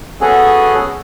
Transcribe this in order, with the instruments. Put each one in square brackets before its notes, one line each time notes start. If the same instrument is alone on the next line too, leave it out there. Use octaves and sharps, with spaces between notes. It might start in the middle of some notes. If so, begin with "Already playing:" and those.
[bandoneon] B3 C#4 F#4 G#4 A4